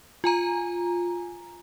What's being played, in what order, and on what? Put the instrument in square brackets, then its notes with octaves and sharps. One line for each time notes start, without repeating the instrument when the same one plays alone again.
[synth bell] F4 G#5 A#5